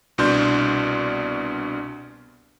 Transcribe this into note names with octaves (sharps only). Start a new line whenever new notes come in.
C2 B2 D4 C6 G6